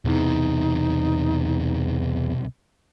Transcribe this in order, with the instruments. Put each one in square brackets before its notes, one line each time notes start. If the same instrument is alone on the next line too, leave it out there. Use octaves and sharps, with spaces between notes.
[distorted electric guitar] B1 C3 [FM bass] E2 [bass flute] D#4